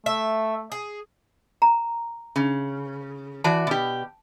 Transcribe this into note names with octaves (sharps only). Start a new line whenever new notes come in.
A3 E5
G#4
A#5
C#3
E3 F#4 D5 A5
B2 G4